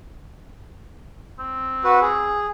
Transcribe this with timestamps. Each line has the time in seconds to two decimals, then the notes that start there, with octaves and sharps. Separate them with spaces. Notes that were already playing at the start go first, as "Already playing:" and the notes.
1.39 C4
1.84 F#4 B4
2.02 G#4